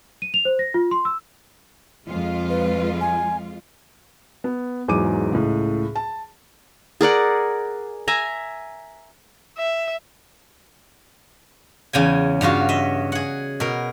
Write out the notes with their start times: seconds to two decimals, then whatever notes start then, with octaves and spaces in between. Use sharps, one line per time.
0.22 D#7
0.34 F7
0.45 C5
0.59 A#6
0.74 F4
0.91 C6
1.05 E6
2.09 F2 G#3 F4
2.50 B4
3.01 G#5
4.44 B3
4.88 E2 G#2 F#3 D6 D#7
5.32 C#2 A2
5.96 A5
7.01 G#4 A#4 D5 F#5
8.08 E5 G#5 A#5
9.57 E5
11.93 E2 C#3 G5 G#5
12.41 G2 C#3 F4 F#4
12.69 D#5 E5
13.12 G#4 F#5
13.60 B2 A#4